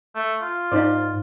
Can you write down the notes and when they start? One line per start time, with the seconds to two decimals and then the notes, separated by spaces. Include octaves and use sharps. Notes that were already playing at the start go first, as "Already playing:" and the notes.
0.15 A3
0.41 F4
0.72 G#2 D#4 C5 D5